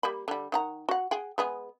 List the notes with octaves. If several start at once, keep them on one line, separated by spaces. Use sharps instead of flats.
G3 A#3 B5
D3 G3
D#3 F#5 A#5
F#4 F#5
G#4 F#5 G5
G#3 B3 G#4